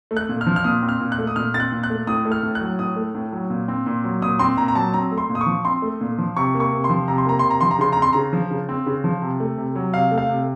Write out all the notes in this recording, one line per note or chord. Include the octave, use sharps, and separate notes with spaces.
A3
F#6
A#2
F6
F3
F6
A#2 D#6
C4
F6
A#2
F#6
A3
D#6
A#2 F6
C4 A6
F#6
A#2
F#6
A3
A2 D#6
A3
F6
A2
F#6
F#3
A2 D#6
A3
A2
F#3
A#2
C4
A#2
F#3
A#2 D#6
C4 C6
A#2 A#5
A#5
F#3 A5
C4 A#5
A3
C6
A#2
D#6
C#6
F3
C4 C6
A3
A#2
F3
C3 C#6
A#3
C#6
C3
C6
F3
C3 A#5
C6
A#3 A#5
C3 C6
A#5
F3 C6
A#5
C#3 C6
C4 A#5
C6
C#3 A#5
F3
C#3
C4
C#3
F3
C3
A3
C3
F#3
C3 F5
A3
F5
C3